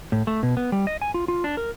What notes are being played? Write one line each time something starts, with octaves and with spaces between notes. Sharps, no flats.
A2
A3
B2
B3
G3
D#5
G#5
F4
F4
D4
A#4